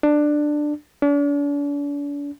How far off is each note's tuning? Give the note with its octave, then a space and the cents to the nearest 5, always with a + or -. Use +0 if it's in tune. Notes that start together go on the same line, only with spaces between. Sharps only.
D4 +15
D4 -40